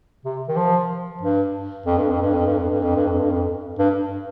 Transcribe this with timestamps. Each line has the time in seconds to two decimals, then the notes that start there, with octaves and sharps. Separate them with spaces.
0.25 C3
0.48 D#3
0.56 F3
1.21 G2
1.86 F2
1.97 G2
2.10 F2
2.22 G2
2.34 F2
2.46 G2
2.58 F2
2.70 G2
2.82 F2
2.95 G2
3.07 F2
3.18 G2
3.30 F2
3.79 G2